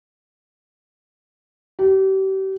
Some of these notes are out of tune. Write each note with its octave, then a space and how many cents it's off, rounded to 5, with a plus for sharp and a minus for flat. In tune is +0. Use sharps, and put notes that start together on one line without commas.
G4 -35